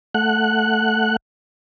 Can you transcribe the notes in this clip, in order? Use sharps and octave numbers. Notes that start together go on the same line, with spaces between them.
A3 F#5 F#6